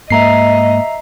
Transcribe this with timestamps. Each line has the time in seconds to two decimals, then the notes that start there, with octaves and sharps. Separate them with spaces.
0.10 G#2 A#3 D#5 E5 A#5 C7